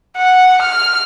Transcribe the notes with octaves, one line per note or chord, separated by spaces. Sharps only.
F#5
F6